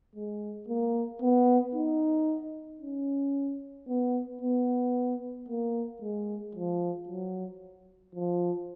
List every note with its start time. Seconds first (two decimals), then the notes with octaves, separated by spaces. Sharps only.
0.15 G#3
0.69 A#3
1.22 B3
1.75 D#4
2.82 C#4
3.88 B3
4.42 B3
5.49 A#3
6.02 G#3
6.55 F3
7.09 F#3
8.15 F3